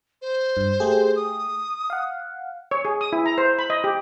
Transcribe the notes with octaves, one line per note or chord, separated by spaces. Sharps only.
C5
G2
A3 G4 G#4
D#6
F5 F#5
C#5
G#4
D#6
E4
A#5
C5
B5
D#5
G4